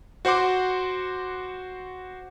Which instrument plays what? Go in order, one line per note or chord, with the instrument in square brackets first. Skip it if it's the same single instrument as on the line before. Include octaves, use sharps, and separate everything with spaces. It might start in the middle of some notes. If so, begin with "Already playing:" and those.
[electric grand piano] F#4 C5 F#5 C6 D6